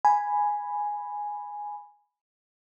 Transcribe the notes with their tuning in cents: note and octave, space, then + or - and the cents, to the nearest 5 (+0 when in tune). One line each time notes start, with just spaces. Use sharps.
G#5 +0 B5 +0